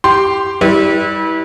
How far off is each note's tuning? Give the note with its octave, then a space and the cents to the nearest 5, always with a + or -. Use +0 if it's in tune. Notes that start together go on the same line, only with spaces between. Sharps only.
G4 +0 C6 -5
G3 +0 E4 -30 B4 -25